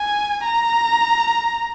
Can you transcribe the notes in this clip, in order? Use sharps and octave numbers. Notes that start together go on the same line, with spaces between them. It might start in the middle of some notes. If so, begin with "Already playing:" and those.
Already playing: G#5
A#5